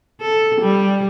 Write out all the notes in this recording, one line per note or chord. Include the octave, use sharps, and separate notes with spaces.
A4
G3